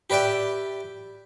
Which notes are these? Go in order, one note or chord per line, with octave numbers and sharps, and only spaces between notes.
G4 B4 D5 E5 G5